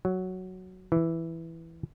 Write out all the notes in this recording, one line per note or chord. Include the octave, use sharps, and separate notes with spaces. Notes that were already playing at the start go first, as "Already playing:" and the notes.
F#3
E3